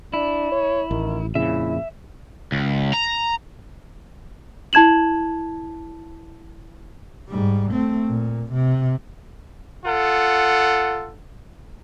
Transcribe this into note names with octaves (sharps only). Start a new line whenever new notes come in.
D4 E4
C#5
A1 D#3
F2 A#2 C#3 E4 E5
C#2
A#5
E4 A5 G#6 E7 F#7
G#2 G3
A3 C4
A#2
C3
F4 A4 F#5